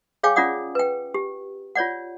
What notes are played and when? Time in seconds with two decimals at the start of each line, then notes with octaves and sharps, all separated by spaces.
0.23 G#4 C#5 F5 G5 G#5 D6
0.36 C#4 F4 D5 F#5 D#6
0.75 B4 G5
1.14 G4
1.75 F4 C#5 D5 F#5